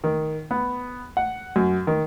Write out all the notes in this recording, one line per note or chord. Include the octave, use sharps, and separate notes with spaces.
D#3
B3
F#5
F#2
D#3